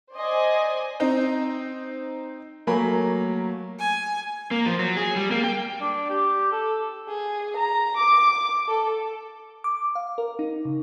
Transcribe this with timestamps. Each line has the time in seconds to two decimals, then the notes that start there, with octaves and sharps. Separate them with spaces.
0.13 C5 D5 D#5 G#5
1.00 C4 D#4
2.67 F#3 A3 A#3 A#4 G#5 B5
3.79 G#5
4.51 A#3
4.66 F3
4.79 F#3
4.97 G#4
5.16 G3
5.31 A#3
5.44 G5
5.81 D4
6.10 G4
6.52 A4
7.08 G#4
7.57 A#5
7.97 D6
8.68 A4
9.64 D6
9.95 F5
10.18 A#4
10.39 D#4
10.65 C#3